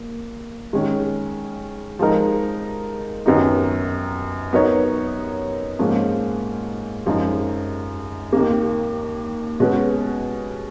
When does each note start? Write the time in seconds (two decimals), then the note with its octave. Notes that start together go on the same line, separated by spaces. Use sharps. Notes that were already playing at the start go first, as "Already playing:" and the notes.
Already playing: A#3
0.73 D#3 G#3 C#4
1.99 F3 G#3 D#4 A#4
3.26 F#2 D#3 F#3 B3 D#4
4.53 F#3 B3 D#4 A#4 C#5
5.79 G#2 F3 A#3 C#4
7.06 F#2 F3 G#3 D#4
8.33 D#2 D#3 A#3
9.60 B2 G#3 C#4 F#4 B4